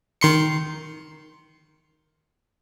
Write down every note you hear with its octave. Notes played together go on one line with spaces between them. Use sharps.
D#3 C6 C#7